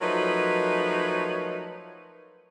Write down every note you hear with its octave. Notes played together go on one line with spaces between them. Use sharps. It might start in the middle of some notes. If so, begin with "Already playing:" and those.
F3 F#3 A3 D#4 A#4 B4